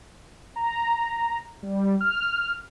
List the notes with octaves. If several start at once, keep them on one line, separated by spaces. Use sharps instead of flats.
A#5
G3
F6